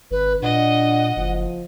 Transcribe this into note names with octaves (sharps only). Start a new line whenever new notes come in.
G#1 B4
A#2 D4 D#5 F#5
F#1 F3